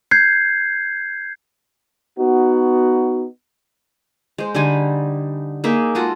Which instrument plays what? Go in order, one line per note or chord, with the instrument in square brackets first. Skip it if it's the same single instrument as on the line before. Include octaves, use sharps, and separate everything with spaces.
[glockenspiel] G6 G#6 C7
[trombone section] B3 D#4 F#4
[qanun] G#3 C5
D3 G3 D#4 G#5
A#3 D#4 G#4 E5
G#3 F4 F#4 A4